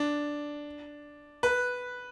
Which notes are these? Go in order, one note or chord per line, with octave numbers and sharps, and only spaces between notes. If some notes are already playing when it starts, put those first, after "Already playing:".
Already playing: D4
B4